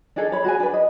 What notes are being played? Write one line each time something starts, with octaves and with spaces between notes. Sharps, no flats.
D4 D#4 G#4 A4
C#5 B5
F#4 G#4 G#5
D4 B4
D#5